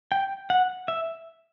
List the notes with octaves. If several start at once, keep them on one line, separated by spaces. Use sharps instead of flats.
G5
F#5
E5